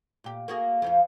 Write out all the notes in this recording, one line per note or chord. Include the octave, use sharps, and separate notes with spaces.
A#2 G4
A#3 F#4 G#4
F2 F3 F4